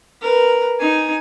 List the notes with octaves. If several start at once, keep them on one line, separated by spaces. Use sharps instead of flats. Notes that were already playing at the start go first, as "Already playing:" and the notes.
A#4 B4
D#4 G#5